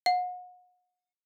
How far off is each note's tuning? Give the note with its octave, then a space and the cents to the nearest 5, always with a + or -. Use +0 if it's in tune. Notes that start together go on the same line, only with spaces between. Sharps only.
F#5 -35